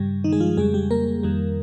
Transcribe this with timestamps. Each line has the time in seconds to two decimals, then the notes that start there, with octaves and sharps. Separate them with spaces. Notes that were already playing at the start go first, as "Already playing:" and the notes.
Already playing: G2 C#3 G3
0.24 D#3 D#4
0.32 G#3 G#4
0.40 F3 F4
0.57 F2 C#3 G3 G#3 G#4
0.74 G3 G4
0.91 A#3 A#4
1.23 F2 D#3 G3